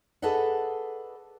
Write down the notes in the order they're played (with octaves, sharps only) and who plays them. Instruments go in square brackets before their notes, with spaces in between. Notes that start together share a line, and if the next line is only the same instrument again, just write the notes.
[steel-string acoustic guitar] G#4 A4 B4 D5 D#5 F#5